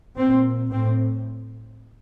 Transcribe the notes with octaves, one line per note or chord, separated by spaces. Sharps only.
A#2 C4
A2 C4